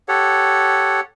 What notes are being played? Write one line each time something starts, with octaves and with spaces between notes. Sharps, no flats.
G4 A4 C#5 F#5